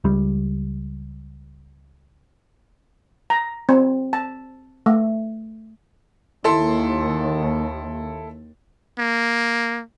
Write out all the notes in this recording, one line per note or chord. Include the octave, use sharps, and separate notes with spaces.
C#2 G3
A#5
C4
A5
A3
D#2 E4 A4 C6
A#3